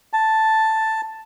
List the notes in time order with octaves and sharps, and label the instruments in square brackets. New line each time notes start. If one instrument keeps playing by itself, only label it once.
[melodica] A5